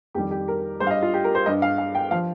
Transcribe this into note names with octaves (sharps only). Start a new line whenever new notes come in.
F2 D#3 G3 G4
G4
A#4
G2 G3 C5
F5
D#5
F4
G4
A#4
C5
G2 G3 D#5
F5
F5
G5
F3 F5